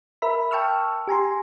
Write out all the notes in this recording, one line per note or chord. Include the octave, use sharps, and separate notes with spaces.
A#4 E5 B5
G5 A5 C#6 E6 F6
G4 G#5 A#5 C6